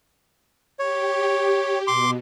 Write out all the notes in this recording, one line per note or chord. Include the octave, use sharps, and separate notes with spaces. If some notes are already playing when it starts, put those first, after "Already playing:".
G4 C#5
B2 C6 D6